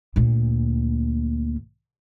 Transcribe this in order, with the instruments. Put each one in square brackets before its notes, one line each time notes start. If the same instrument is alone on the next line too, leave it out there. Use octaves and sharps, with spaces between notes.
[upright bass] D2 A#2